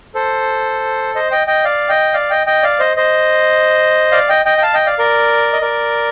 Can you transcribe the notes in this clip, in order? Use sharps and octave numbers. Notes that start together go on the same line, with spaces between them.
A4 C5
C5 D#5
D#5 G5
D#5 G5
D5 F5
D#5 G5
D5 F5
D#5 G5
D#5 G5
D5 F5
C5 D#5
C5 D#5
D5 F5
D#5 G5
D#5 G5
G5
F5 A5
D#5 G5
D5 F5
A#4 D5
D#5
A#4 D5